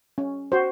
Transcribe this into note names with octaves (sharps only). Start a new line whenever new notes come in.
C#4
F#4 C5